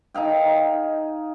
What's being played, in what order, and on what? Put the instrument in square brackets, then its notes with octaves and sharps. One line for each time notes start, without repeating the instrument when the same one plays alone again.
[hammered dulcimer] D#4 G#4 F5 G5